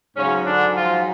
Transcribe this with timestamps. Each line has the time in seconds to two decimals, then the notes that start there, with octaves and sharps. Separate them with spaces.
0.16 G#2 C#3 F#3 C#4
0.45 D3 D4
0.76 F3 F4